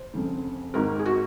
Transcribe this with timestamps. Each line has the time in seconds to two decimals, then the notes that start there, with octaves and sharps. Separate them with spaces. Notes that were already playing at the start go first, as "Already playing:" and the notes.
Already playing: C5
0.14 F1 F2 C#3
0.74 G#1 G#2 D#3 A#4
0.99 G#4
1.05 F#4